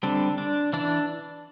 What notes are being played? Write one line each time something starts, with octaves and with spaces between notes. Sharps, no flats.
D3 G3 C4 D4
D4
E3 D4